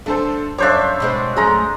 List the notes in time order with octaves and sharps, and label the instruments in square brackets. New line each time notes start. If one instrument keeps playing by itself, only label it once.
[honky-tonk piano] D3 A4 C5 [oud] A3
[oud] F#2 F5 [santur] D4 C5 D6 [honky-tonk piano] C#5 E5
[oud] B2 G#3 C4
[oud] F#2 A3 C#4 [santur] G#3 A#5